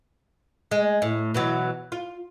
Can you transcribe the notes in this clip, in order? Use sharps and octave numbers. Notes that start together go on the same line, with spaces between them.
G#3
A2
B2 E3 F#3
F4